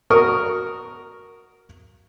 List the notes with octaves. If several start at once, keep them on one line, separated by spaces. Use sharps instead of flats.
F#4 A#4 C#6 D#6 F6